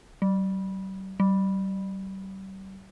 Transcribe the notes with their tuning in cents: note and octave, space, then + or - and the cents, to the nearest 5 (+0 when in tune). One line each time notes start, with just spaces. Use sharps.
G3 -45
G3 -35